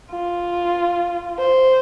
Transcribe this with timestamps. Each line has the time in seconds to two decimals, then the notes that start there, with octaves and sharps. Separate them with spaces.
0.11 F4
1.38 C5